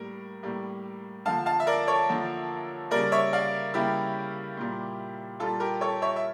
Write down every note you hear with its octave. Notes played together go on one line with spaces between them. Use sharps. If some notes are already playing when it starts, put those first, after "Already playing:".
Already playing: A2 G3 A#3 A#4
A2 G3 A#3
D3 F3 A#3 F5 A5
F5 A5
E5
A#4 D5
A4 C#5
D3 F3 A#3
C#3 G3 A#3 A#4 D5
C#5 E5
D5 F5
C#3 G3 A#3 E4 G4
A#2 G3 A#3
A#2 G3 A#3 F4 A4
G4 A#4
A4 C#5
C#5 E5
E5